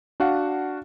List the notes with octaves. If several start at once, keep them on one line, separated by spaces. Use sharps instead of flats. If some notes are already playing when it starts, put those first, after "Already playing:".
D4 F#4 F5 F#5